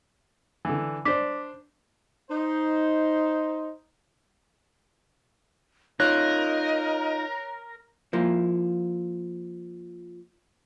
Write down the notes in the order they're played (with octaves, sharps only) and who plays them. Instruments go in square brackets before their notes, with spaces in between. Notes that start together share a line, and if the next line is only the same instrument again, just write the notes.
[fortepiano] D3 E3
[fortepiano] D4 C5 [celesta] D6 B6
[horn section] D#4 C5
[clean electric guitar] D#4 F4 [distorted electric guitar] A#4 [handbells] C#5 F#6 A#6 [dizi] D#5
[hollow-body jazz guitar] F3 A#3 E4